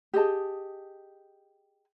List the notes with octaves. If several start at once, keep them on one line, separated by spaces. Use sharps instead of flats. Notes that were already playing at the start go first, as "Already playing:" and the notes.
G4 G#4 D#5 A5